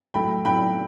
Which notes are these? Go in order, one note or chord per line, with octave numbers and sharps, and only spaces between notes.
A2 F#3 A3 E4 G5 B5
A2 F#3 A3 E4 G5 B5